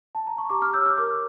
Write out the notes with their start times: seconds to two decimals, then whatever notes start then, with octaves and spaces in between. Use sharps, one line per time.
0.15 A5
0.27 A#5
0.38 C#6
0.49 G4 A#5 D6
0.62 D6 F6
0.73 C#5 E6 G6
0.85 D6 F6
0.97 A#4 D6 F6